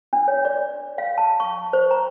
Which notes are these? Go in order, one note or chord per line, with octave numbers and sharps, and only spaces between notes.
D4
C#5
D5
F5
A5
C#6
C5
A#5